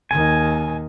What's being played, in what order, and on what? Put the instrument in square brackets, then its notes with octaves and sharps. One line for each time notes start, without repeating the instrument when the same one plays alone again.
[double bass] D#2 D#3 [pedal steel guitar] G#5